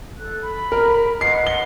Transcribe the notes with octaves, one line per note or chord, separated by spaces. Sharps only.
A4 F#6
B5
A#4
B4 D#5 F#5 C7
G7